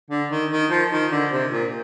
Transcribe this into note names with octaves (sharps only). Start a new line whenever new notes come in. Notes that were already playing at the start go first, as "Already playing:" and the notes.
D3
D#3
D#3
F3
D#3
D3
C3
A#2